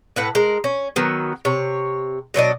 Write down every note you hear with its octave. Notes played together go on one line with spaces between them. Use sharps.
A2 B4 F#5
G#3 A#4
C#4
D#3 F#3 B3
C3 C#5
B2 F#3 D4 D#5